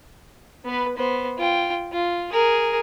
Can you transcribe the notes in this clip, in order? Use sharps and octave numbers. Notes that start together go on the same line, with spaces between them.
B3 B4
B3 C5
F4 G5
F4
G#4 A#4